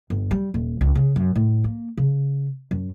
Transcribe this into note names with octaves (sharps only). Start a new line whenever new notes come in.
G1
G3
D#1
C#2
C#3
F#2
A2
A#3
C#3
F#2